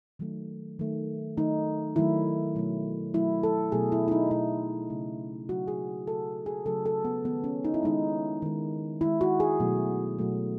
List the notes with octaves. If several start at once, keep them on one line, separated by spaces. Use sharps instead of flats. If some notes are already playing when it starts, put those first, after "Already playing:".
D#3 F#3 A3
D#3 F#3 A3
D#3 F#3 A3 D#4
D#3 F#3 A3 E4
B2 F#3 A3
B2 F#3 A3 E4
A4
B2 F#3 A3 G#4
E4
E4
D#4
B2 F#3 A3 E4
C#3 F#3 A3
C#3 F#3 A3 F#4
G#4
C#3 F#3 A3 A4
G#4
C#3 F#3 A3 A4
A4
B3
D#3 G#3 B3
C#4
D#4
E4
D#3 G#3 D#4
D#3 G#3
D#3 G#3 E4
F#4
G#4
B2 F#3 A3
B2 F#3 A3